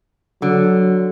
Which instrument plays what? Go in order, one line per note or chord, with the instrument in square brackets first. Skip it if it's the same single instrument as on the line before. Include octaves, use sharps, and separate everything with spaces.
[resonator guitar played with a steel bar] D3 [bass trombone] F#3